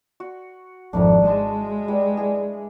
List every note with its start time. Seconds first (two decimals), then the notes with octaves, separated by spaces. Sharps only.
0.20 F#4
0.93 G#1 F2 D4 E4 A#4
1.25 G#3 C5 A5
1.88 G3 B4 D5
2.17 E4 G#4